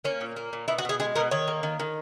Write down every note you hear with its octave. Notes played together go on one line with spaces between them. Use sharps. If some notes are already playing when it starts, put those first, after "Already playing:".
A#3 C#4
A#2
A#3
A#2
B2 E4
F#4
B2 G#4
G#3 G#4
B2 A#4
D#3 C#5
A#3
D#3
D#3